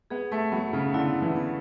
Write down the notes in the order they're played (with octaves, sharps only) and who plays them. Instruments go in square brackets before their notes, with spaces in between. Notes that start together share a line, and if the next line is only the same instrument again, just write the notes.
[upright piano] B3 [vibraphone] G#4
[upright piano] A3
[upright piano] F#3 [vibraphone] B3
[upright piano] C#3
[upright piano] D3 [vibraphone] E4
[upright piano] E3
[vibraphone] B3